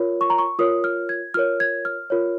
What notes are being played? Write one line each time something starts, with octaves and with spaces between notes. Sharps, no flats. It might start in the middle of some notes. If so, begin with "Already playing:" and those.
Already playing: F4 A#4 C#5
C#6
A#5
C#6
F4 A#4 C#5 D#6
F6
G#6
F4 A#4 C#5 F6
G#6
F6
F4 A#4 C#5